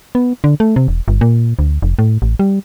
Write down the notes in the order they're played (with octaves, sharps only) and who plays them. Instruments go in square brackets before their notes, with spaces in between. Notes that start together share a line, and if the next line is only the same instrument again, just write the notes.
[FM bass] B3
D3
A3
C3
E1
G1
A#2
D2
F1
A2
A1
G3